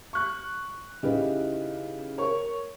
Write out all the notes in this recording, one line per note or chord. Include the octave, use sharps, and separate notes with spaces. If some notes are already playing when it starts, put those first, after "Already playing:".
C#6 F#6
C#3 D#4 E4 G4 B4
A#4 C#5 C#6